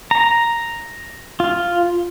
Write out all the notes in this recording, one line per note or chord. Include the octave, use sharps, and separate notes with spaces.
A#5
F4